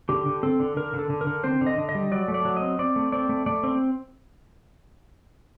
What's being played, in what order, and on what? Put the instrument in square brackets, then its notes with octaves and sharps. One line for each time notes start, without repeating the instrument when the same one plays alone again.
[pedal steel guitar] D3 G4
D3
C4 A4
D3
D3 A#4
D3
A4
D3
A#4
D3
C4 C5
D3
D#5
D3
D#5
G3
F#3 D5
A3
D5
F#3
D#5
C4
C4 D5
A3
C4 D5
A3
A3 D5
C4